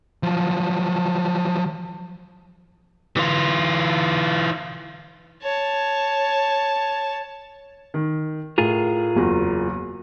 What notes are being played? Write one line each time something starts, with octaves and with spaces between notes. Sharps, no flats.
F3 F#3
E3 F4
C#5 A5
D#3
A2 F4 G#4 A#4
F#1 E2 F#4